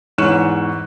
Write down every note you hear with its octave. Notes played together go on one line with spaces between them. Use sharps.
E2 G#2 C#5 C#6 F#6 E7